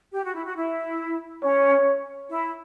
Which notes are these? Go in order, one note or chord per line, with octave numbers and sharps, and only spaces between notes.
G4
F#4
E4
F#4
E4
C#4 C#5
E4